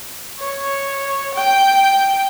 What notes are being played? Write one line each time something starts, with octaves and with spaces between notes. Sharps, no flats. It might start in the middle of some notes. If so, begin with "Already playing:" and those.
C#5
G5